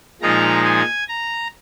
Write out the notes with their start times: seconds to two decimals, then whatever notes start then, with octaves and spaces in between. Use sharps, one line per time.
0.22 A#2 F3 G#3 D#4 A#5
0.65 G#5
1.09 A#5